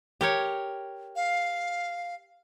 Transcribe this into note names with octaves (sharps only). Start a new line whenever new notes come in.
G4 A#4 C#5
F5